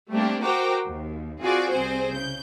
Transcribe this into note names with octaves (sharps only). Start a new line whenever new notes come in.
G3 A3 A#3 C4 D4 G4
F#4 A#4 C5 G5 A#5 D6
D#2
C4 F4 F#4 G#4 D5
C2 C4 G#4 C5
C#3 G6